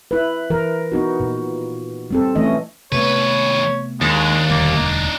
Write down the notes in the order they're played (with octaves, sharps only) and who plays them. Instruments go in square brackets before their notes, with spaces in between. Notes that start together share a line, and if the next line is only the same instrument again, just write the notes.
[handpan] E4 B4
E3 A#4
B3 D#4 F#4
A#2
G3 C4 A4
E3 A3 C#4 D#5
[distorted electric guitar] D#2 B4 [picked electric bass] C3 A3 B3 [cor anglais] C#5
[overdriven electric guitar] D#2 [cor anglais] G#3 [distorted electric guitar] D4 D#4
[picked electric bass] E1 D2 G3 [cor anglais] A#3